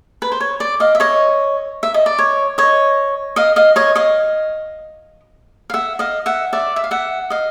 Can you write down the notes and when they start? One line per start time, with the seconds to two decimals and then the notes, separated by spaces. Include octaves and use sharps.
0.22 B4
0.32 C5
0.41 C#5
0.60 D5
0.80 D#5 F5
0.95 E5
1.00 C#5 D#5
1.83 E5
1.94 D#5
2.06 D5
2.19 C#5
2.58 C#5 D#5
3.36 D#5 F5
3.56 D#5 F5
3.76 C#5 D#5
3.96 D#5 F5
5.70 F5
5.74 E5 F#5
5.99 D#5 F5
6.26 E5 F#5
6.53 D5 E5
6.76 E5
6.84 F5
6.91 E5 F#5
7.30 D#5 F5